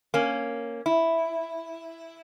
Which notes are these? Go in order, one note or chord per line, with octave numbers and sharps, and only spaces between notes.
A#3 C#4
E4